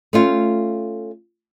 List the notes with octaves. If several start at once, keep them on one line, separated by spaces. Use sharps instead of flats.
A3 C#4 F4